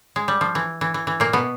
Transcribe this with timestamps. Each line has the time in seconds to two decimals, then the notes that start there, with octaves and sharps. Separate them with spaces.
0.16 G#3
0.28 G3
0.41 F3
0.55 E3
0.81 E3
0.94 E3
1.07 E3
1.20 A#2 A#3
1.33 B2 B3